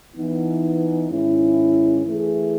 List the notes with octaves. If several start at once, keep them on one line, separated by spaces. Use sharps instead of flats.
E3 B3 D#4
G#2 D#3 G#3 C#4 E4
E3 A3 E4 G#4